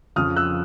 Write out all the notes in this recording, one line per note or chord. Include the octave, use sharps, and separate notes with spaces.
F2 C#3 F3 D#6 F6
E6 F#6